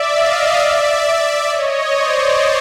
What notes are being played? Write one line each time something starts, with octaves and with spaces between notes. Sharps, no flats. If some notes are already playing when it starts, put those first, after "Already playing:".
Already playing: D5 E5
D#5 F5
D5 E5
C#5 D#5
C5 D5